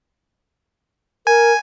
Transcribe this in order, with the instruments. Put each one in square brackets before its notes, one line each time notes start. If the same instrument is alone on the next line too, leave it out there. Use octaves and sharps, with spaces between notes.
[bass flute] A#4 [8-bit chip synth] G#5